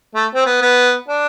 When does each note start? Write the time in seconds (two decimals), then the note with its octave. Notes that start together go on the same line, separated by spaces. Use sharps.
0.15 A3
0.35 C4
0.46 B3
0.61 B3
1.08 D4